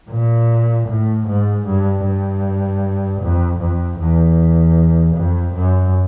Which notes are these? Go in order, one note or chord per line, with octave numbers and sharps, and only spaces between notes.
A#2
A2
G#2
G2
G2
F2
F2
E2
F2
F#2